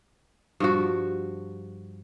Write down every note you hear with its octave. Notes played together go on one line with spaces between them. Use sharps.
G2 F3 F#4